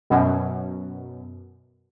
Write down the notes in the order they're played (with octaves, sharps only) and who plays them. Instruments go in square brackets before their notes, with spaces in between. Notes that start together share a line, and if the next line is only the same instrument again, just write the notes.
[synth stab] F#2 B2